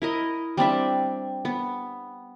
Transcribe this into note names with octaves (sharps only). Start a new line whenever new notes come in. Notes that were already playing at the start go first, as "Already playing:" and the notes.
E4 A#4 D#5
G3 C4 D4 E5
B3